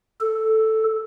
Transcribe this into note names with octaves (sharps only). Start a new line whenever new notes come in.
A4